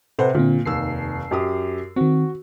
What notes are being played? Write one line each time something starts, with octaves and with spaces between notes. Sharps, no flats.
C3 A4 B4 C5 F#5
A#2 D3 C4
F1 D#2 E6 C7
F#2 G4 D#6
D#3 C4 F#4